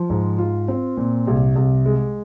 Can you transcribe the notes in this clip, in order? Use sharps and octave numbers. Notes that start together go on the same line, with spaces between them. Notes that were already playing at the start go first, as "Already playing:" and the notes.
Already playing: F3
G#2
F4
C4
A#2
C2
C2
G#3